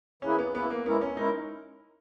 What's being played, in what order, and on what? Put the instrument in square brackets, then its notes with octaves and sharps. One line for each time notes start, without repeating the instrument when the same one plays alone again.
[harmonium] E3 A#3 E4 G#4 B4 [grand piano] C#4
[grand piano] B3
[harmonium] E3 A#3 E4 G#4 B4 [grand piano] B3
[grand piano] A#3
[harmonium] G#3 C#4 E4 A#4 [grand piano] B3
[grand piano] C#4
[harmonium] G#3 C#4 E4 A#4 [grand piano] D#4